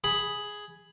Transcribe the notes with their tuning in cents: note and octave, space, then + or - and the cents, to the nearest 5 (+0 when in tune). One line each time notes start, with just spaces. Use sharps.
G#4 +0 B5 +0